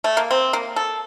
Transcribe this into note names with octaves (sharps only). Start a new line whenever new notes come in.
A3
A#3
C4
A#3
A4